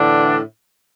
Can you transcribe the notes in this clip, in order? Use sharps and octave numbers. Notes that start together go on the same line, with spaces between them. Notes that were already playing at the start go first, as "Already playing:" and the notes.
Already playing: A2 D3 E3 D4